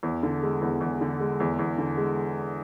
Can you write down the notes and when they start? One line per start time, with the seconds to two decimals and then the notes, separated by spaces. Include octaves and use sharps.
0.03 E2
0.23 D3
0.43 G#3
0.62 E2
0.81 E2
1.01 D3
1.20 G#3
1.40 E2
1.59 E2
1.78 D3
1.97 G#3